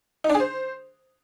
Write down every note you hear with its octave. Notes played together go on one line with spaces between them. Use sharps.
D#4
D4
G#4
C5